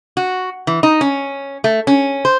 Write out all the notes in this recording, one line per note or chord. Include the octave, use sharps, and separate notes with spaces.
F#4
E3
D#4
C#4
A3
C#4
C5